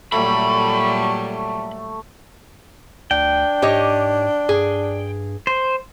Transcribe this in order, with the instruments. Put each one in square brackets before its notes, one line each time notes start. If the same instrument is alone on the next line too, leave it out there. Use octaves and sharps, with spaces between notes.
[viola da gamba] A#2 F#3 G3 [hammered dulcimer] A3 [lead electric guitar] B5
[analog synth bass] D2 [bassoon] D4 [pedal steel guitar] G5
[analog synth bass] G#2 [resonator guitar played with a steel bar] G4 C#5 D#5
[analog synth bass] G2 [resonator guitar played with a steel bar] G#4
[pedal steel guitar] C5